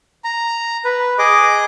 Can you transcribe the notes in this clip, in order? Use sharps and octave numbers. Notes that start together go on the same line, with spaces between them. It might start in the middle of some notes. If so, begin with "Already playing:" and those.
A#5
B4
G#4 D#5 D6